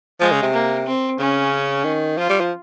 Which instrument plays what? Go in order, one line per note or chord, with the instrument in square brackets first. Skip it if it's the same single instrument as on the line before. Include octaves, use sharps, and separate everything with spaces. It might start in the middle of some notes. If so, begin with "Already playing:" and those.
[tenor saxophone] F3 [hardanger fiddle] G#3
[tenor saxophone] C#3
C3
[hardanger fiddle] A#3
C4
[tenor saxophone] C#3 [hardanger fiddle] C#4
[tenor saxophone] D#3
[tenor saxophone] F3 [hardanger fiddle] F4
[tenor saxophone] G3
F3